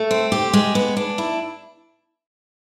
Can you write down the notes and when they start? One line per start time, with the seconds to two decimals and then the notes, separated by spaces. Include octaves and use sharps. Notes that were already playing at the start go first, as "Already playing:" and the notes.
Already playing: A3
0.11 C4
0.32 G4
0.53 G#3
0.75 B3
0.97 D4
1.18 E4